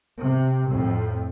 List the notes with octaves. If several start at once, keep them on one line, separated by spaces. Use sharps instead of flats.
C3
F2 A2